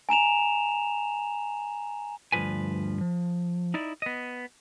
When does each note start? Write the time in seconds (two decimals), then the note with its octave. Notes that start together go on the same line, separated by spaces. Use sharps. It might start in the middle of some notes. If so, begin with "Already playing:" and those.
0.09 G#5 A#5 E7 F7
2.32 D2 G2 C#3 F3 B4 G#5
3.01 F3
3.74 D#4 E4 D5
4.02 B3 D#5